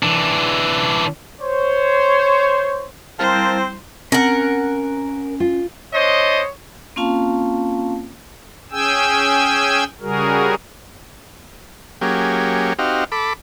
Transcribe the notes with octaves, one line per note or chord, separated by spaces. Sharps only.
E3 D4
C5 C#5
G3 C4 E4 A#4 C5 F5 A5 A#5
C4 C#4 A#4 F#5 F6
F4
D4 C5 C#5 D#5
A#3 C4 C#4 F4 F5 A5
C#4 G#4 G5 G#5 E6
C#3 G3 F#4 G#4 A#4
F#3 A#3 C#4 G4 G#4
C4 D#4 F#4 G4 F5
A4 B5 D6